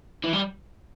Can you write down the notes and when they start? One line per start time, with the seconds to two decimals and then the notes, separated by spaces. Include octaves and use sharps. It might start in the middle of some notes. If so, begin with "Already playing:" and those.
0.24 E3
0.33 G3